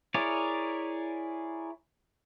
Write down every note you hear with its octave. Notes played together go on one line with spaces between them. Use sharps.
E4 G#4 A#4 C#5 D5